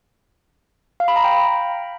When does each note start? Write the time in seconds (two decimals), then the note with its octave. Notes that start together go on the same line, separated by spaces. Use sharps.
1.00 F5
1.08 B5
1.16 A#5
1.24 G5